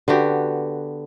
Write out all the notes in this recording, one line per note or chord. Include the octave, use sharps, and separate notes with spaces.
D3 B3 F#4 G4